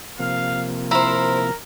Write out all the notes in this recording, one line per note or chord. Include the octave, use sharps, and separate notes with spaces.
C3 F3 A#3 F5
E4 A#4 C5 A#5